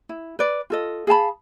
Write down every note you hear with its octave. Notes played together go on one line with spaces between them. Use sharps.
E4
B4 D5
F4 A4 D#5
G#4 F5 A5 B5